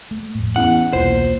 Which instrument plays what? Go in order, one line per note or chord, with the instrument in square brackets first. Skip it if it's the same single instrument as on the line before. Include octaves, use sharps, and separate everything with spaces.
[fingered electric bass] A3
F2 A2
[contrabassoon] E2 [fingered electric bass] C#4 [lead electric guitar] F#5
[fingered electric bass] E1 C2 [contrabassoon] A#2 [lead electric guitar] C5